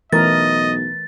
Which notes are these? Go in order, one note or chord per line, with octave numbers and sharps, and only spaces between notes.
B1 E3 A3 A#4 D#5 A6